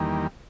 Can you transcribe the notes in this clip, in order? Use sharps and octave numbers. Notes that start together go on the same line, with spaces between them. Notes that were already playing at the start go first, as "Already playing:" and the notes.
Already playing: E2 D#3 G3 A#3